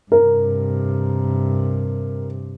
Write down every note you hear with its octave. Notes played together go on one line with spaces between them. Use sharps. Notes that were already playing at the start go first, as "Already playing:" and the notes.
G2 C3 A#4